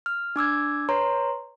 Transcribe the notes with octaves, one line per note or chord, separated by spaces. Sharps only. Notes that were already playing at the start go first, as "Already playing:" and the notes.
F6
D4 D6 E6 G#6
B4 C#5 A#5 C6